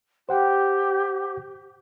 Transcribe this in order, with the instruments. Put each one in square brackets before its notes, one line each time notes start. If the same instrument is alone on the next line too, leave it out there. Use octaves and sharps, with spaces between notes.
[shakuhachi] G4 [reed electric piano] C5 F#5 G5